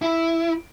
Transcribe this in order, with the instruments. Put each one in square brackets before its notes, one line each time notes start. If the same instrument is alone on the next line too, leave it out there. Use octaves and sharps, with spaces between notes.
[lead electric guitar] E4